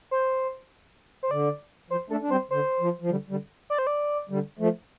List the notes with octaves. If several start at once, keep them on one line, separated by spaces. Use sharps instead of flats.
C5
C5
D3 D5
F3 C5
A3 D4 A4
D4
G3 C4 C5
D3 C5
F3
F3
D3 G3
D3 G3
D5
C5
D5
D3 G3
F3 A3